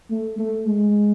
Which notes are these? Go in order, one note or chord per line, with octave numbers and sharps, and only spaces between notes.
A3
A3
G#3